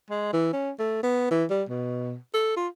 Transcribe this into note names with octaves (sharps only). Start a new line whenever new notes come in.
G#3
E3
C#4
A3
B3
E3
G3
B2
A4
F4